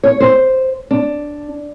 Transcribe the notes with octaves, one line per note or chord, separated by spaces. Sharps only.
C#5
C5
D4